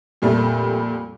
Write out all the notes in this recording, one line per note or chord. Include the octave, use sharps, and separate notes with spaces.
F2 A#2 G3 A3